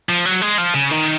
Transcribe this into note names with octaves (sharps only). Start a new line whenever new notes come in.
F3
F#3
G#3
F3
C#3
D#3